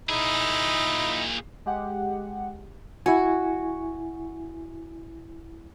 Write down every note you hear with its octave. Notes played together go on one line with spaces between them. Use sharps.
A#2 D#4 E4 G#4
G#3 G4 F#5
E4 F#4 G#5